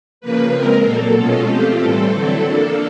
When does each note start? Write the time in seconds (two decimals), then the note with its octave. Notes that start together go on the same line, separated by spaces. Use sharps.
0.21 C#3 F3 A#3 B4
0.53 F3 G#3 C4 A#4
0.84 A#2 F#3 A#3 A4
1.16 B2 G#3 C#4 F4
1.47 F3 A3 C4 F4 G4
1.79 A2 E3 G3 C4 A4
2.10 D3 F#3 A3 C4 E4
2.42 F3 A#3 D4